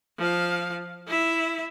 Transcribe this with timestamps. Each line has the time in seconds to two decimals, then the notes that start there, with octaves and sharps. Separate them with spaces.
0.18 F3 F5
1.07 E4 E5